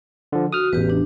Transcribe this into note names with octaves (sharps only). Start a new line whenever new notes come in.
D3 F3
F#4 D#6 F6
A1 E2 G4 B4
D4